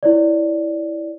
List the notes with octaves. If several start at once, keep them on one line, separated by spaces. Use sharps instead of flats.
E4 C#5 D5